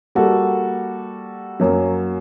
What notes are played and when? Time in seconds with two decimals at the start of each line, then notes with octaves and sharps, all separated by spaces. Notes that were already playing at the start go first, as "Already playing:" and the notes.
0.15 G3 A#3 F#4 A4
1.60 F#2 F#3 A#3